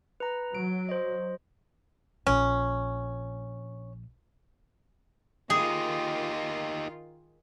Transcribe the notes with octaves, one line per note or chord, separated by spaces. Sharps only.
B4 A#5
F#3 D7
C5 D#5
A#1 C#4
D#3 D#4 F4 G4 G#4